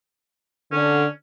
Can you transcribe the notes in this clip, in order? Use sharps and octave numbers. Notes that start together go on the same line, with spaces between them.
D3 C#4